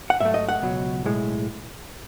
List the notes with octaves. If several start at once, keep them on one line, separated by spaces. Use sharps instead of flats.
F#5
G#2 F#3 A3 E5
D#5
F#5
C#2 B2 F#3
B1 A2 G#3